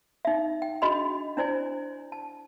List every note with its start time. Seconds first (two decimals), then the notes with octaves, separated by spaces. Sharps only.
0.25 D#4 E5
0.62 G5
0.82 D4 F#4 G#4 D#5 B5 C6
1.37 D4 E4 C5 D5 G#5
2.12 A5